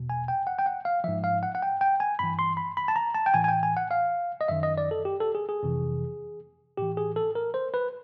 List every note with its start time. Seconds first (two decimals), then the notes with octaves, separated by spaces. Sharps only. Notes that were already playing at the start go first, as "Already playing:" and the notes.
Already playing: E2 B2
0.10 G#5
0.28 G5
0.47 F#5
0.59 G5
0.66 F#5
0.85 F5
1.04 G#2 F3 E5
1.24 F5
1.43 F#5
1.55 F#5
1.62 G5
1.81 G5
2.00 G#5
2.19 G2 E3 B5
2.39 C6
2.57 B5
2.77 B5
2.88 A5
2.96 A#5
3.15 A5
3.26 G5
3.34 A2 E3 G#5
3.44 G#5
3.48 G5
3.63 G#5
3.77 F#5
3.91 F5
4.41 D#5
4.48 F#2 D#3 E5
4.63 D#5
4.78 D5
4.91 A4
5.05 G4
5.21 A4
5.35 G#4
5.49 G#4
5.63 F2 C3 E3
6.77 A2 E3 G4
6.97 G#4
7.16 A4
7.35 A#4
7.54 C5
7.74 B4